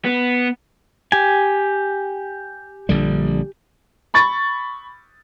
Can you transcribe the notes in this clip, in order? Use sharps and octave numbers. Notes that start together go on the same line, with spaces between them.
B3
G4 G#5
A#1 D3 G3
B5 C#6 A6